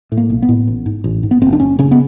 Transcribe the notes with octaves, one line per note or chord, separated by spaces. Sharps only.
A2
A#3
B1
B3
A2
A1
G#2
A1
G#2
B3
F#1 C4
D4
F#1 C#4
C#3 C#4
B3